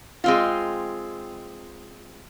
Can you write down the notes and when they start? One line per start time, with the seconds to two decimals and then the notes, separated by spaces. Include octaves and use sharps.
0.24 G#3 C4 F4